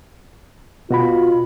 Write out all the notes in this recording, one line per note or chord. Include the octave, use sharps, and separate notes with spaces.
B2 F4 F#4 B5